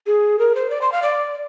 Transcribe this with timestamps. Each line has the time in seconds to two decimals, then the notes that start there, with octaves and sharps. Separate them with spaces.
0.07 G#4
0.39 A#4
0.55 C5
0.70 D5
0.81 C6
0.92 F5
1.02 D5